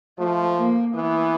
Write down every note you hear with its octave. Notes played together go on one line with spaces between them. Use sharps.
F3 A3
A#3
E3 B3